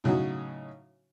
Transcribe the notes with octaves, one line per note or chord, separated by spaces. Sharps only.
A2 C#3 F#3 D#4 F#4